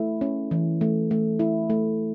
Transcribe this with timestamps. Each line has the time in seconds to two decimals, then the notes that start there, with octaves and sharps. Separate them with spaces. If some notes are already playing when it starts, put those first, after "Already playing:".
Already playing: A3 E4
0.21 C#4
0.51 E3
0.81 A3
1.11 A3
1.39 E4
1.70 A3